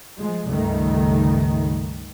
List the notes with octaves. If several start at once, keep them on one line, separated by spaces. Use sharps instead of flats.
F3 G#3
C#2 G2 D#3 A3